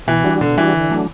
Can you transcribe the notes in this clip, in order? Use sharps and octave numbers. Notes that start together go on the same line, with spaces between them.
B2 E3
G3 D4 F#4
B2 D3
E3 G3 D4 F#4
D3
F#3 A3 D4